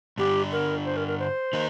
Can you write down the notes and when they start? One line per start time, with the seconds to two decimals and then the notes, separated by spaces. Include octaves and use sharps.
0.18 G2 D3 G3 D4 G4
0.52 A#4
0.86 C5
0.97 A#4
1.08 A#4
1.19 C5
1.53 D#3 A#3 D#4